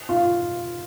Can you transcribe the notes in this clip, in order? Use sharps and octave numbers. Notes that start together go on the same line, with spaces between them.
F4